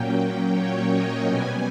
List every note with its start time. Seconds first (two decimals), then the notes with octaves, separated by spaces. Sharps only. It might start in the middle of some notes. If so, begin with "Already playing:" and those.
Already playing: A#2 F#3 A#3 C#4 G5
0.54 C#5
0.90 D#5
1.25 B2 G3 B3 G#5